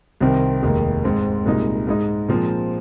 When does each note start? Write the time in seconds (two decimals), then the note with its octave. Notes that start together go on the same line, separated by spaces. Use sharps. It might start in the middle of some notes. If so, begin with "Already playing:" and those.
0.21 C2 C3 D#3 C4
0.63 F1 D#2 D#3 G#3
1.04 G#2 G#3 C4
1.46 C2 A#2 G#3 D#4
1.87 G#2 G#3 D#4
2.29 A#2 F3 G#3 C4